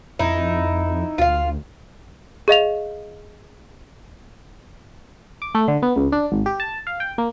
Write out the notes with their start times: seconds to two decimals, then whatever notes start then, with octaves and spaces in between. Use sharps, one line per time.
0.19 F2 D#4 E4
1.18 D2 F4 F5
2.48 G#4 D#5 F5 F7
5.42 D6
5.55 A3
5.68 D3
5.82 B3
5.96 C#2
6.12 D4
6.32 G#1
6.46 G4
6.60 A5
6.87 F5
7.00 G5
7.18 A#3